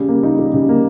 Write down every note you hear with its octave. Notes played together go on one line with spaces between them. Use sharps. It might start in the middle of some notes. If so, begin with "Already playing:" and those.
Already playing: C#3 G3
A#3
D#4
G3
C#3
A#3